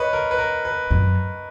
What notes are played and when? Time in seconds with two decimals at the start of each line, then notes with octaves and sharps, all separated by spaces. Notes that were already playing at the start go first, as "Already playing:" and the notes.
Already playing: B4 C#5 D#5
0.13 A#4
0.31 B4
0.38 A#4
0.65 B4
0.91 F#2